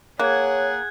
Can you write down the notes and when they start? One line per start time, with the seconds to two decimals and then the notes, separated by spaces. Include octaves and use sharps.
0.19 A#3 G#4 C#5 F#5 F#6 G#6